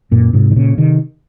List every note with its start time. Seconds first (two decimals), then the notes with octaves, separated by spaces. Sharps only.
0.11 F#2 A#2
0.33 G#2 C3
0.51 D#3
0.56 A#2 C#3
0.78 C3 D#3